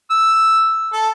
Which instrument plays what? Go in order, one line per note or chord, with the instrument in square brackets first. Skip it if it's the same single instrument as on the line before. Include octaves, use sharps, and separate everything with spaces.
[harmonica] E6
A4